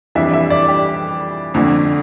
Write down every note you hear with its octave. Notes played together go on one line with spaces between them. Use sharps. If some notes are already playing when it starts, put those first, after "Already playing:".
F2 E3 G3 D4 E5
E5
D5
G4
F2 D3 A3 D4